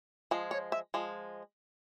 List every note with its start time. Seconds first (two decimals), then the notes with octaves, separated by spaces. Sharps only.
0.31 F3 G#3
0.51 C#5
0.72 E5
0.94 F3 G#3